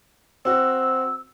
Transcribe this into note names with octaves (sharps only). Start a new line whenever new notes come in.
C4 F#4 E6